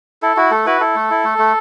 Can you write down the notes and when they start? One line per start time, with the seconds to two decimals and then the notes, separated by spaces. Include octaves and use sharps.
0.22 E4 A4
0.37 E4 F#4
0.51 A3 A4
0.66 E4 F#4 B4
0.80 E4 A4
0.95 A3
1.10 E4
1.24 A3
1.38 A3